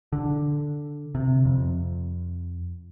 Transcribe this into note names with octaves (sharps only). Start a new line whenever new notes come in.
D3
C3
F2